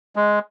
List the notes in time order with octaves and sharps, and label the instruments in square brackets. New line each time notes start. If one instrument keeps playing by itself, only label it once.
[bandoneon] G#3